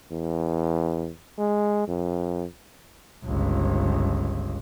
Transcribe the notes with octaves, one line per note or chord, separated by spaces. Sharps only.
E2
G#3
F2
G1 C#2